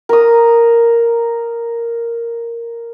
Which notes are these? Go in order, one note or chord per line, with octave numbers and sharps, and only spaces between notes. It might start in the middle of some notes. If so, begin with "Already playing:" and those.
A#4 D#6